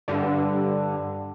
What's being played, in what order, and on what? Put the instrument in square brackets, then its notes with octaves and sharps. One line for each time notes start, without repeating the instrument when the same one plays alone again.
[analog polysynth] G2 D3